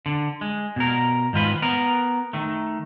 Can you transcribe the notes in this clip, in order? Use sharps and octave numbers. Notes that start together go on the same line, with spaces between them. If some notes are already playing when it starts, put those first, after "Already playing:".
D3
G#3
B2 A#4
G#2 D#3 F4 B4
B3 A#4
D#3 A3